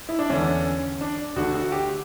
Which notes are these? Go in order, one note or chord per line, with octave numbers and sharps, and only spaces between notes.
E4
D4
E2 D3 C#4
D4
D2 D3 F#4
F#4
G4